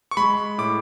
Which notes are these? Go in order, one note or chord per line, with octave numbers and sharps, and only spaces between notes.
C#6
G#3 B5
A2 D6